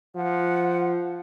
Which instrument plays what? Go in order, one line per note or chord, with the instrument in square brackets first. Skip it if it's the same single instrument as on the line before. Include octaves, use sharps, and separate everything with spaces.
[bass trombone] F3 [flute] F#5